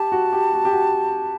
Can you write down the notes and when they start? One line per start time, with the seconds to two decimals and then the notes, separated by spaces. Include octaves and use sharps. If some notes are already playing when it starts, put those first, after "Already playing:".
Already playing: G4 A5
0.12 F#4
0.33 G4
0.53 F#4
0.65 G4
0.73 F#4